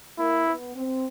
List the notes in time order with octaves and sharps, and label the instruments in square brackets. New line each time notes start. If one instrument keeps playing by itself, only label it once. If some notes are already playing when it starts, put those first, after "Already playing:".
[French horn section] A#3 [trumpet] E4
[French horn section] B3
C4